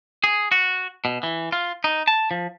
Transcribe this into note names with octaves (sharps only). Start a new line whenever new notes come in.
G#4
F#4
B2
E3
F4
D#4
A5
F3